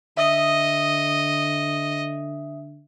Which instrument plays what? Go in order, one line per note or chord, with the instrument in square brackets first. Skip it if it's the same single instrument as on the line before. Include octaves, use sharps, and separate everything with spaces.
[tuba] D3 [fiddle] D#5 [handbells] E5 D#6